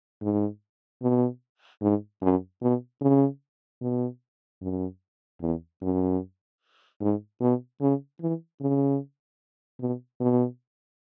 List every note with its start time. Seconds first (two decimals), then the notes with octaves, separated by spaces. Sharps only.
0.22 G#2
1.02 B2
1.82 G#2
2.22 F#2
2.62 B2
3.01 C#3
3.82 B2
4.62 F#2
5.41 E2
5.82 F#2
7.01 G#2
7.41 B2
7.81 C#3
8.21 E3
8.61 C#3
9.80 B2
10.20 B2